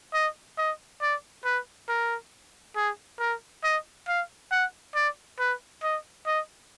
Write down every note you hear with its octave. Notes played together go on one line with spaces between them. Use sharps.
D#5
D#5
D5
B4
A#4
G#4
A#4
D#5
F5
F#5
D5
B4
D#5
D#5